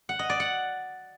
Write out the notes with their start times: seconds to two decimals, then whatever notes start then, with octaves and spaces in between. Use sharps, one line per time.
0.09 F#5
0.19 D#5
0.30 D5
0.40 F#5